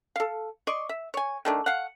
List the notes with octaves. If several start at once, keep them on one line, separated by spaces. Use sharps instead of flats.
A4 F5
D5 D#5 C6 C#6
E5
C#5 G#5
D#3 A3 D4
F5 F#5